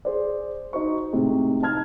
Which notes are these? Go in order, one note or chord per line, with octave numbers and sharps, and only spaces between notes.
G#4 C5 D5
D#4 F#4 C5 C#6
A2 C3 G#3 D#4
D#4 A5 F6 G#6